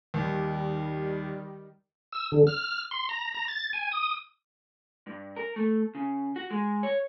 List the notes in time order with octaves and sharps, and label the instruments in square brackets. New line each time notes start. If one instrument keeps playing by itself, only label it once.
[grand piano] D#2 [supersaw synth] D#3 G3
[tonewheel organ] E6
D3
F6
C6
A#5
A#5
A6
G#5
D#6
[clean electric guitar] G2
A#4
A3
C#3
F#4
G#3
C#5